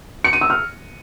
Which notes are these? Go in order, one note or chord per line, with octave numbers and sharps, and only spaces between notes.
C#7
D#7
E6
F6